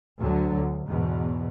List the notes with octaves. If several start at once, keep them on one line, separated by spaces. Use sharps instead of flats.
D2 D3 F#3
D2
E2 G#2 B2